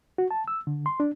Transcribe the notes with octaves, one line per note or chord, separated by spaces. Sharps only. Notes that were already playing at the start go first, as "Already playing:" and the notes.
F#4
A5
E6
D3
C6
D4